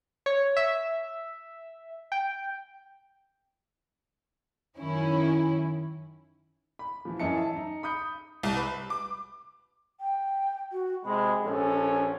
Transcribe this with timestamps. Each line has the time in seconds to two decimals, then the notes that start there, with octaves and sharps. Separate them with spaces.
0.26 C#5
0.57 E5
2.12 G5
4.78 F#2 D#3 C#4 E4
6.79 B5
7.05 E3 F3
7.19 F#2 E3 D#5 E5 A5 C#7
7.37 E5 A5
7.56 D#4
7.83 B5 D#6 G6 C#7
8.43 C2
8.57 B4
8.90 D6
10.01 G5
10.72 F#4
11.05 C3 G#3 B5
11.43 A#1 C#4 A4